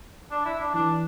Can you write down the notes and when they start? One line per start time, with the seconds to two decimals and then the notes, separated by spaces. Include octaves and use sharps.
0.31 D4
0.45 E4
0.60 D4
0.74 E3 D4